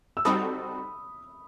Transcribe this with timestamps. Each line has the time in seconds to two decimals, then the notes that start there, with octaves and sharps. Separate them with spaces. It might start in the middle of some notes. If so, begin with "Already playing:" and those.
0.17 E6
0.25 G3 C4 D#4 F#4 A4 B5 D#6